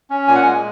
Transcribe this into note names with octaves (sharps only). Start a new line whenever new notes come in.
C#4
A#2 G#5
F#5
G#3 G#5